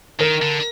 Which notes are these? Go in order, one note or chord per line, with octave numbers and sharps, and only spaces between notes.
D#3 A#4
D3